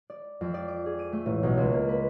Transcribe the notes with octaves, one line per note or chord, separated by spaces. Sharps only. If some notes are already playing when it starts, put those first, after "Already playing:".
D5
F2
D5
D6
G#4
D#7
A3
A1
B1
C#2
A#3
B4